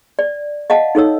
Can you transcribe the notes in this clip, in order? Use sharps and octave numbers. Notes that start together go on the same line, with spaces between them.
D5
D#5 F5 F#5 A5
D#4 A4 C#5 E6